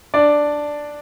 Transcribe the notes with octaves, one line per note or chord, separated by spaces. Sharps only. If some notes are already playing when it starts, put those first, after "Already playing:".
D4 D5